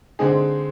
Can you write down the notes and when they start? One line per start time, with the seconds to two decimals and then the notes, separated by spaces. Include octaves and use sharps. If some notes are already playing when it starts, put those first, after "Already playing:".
0.19 D3 G#3 C4 D#4 G#4